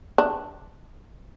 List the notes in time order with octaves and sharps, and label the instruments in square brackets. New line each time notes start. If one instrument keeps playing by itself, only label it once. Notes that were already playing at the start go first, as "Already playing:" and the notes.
[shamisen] D4